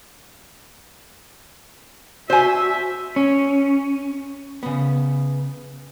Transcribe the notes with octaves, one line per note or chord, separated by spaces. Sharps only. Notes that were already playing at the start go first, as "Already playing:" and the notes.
F#4 C5 E5 G#5
C#4
C#3 B3